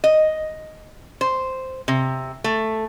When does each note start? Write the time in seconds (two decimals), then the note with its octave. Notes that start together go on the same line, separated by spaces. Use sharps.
0.04 D#5
1.21 C5
1.88 C3
2.44 A3